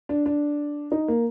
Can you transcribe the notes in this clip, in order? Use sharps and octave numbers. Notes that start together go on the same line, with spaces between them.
D4
D4
D#4
A#3